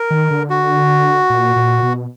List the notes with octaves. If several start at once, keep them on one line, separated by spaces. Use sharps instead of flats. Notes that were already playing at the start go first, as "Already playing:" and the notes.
Already playing: A#4
D#3
D3
F#4
A#2
A#2
B2